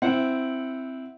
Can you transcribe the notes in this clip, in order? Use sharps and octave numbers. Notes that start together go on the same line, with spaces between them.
C4 E4 F#5